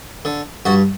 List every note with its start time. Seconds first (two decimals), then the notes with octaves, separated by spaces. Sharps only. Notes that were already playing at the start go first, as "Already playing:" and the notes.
0.25 D3
0.65 G2 F#4